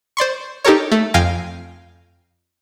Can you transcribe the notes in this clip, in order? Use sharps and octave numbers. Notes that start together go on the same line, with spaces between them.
C5 D5 C6 C#6
D#4 G4 A4 A#4 C#5
A3
F2 F5 G5 G#5 A#6